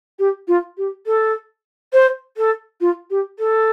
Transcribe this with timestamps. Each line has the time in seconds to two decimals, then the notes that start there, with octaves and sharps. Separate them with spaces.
0.19 G4
0.47 F4
0.77 G4
1.06 A4
1.93 C5
2.37 A4
2.80 F4
3.10 G4
3.38 A4